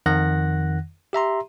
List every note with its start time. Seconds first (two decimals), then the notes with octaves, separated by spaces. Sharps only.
0.06 F2 D#3 F#5 F#6 A#6
1.13 G4 E5 A#5 C6